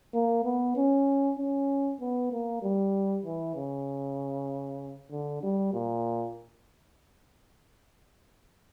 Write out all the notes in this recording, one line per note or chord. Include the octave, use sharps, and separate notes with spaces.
A#3
B3
C#4
C#4
B3
A#3
G3
E3
C#3
D3
G3
A#2